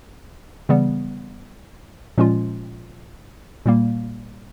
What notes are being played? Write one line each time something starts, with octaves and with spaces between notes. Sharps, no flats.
C#3 E3 G3 B3
A#2 F3 G#3 C#4 F4
A#2 G3 A#3